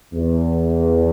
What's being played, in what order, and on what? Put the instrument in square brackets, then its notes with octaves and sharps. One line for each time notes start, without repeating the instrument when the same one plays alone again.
[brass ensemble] E2